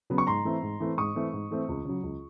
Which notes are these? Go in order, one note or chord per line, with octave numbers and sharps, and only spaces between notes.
C#3 F#3 B3
C#6
G#2 A#5 C6
E3 A3 C4
G#2
E3 A3 C4
G#2 C#6 D#6
E3 A3 C4
G#2
E3 A3 C4
C#2
C#3 F#3
C#2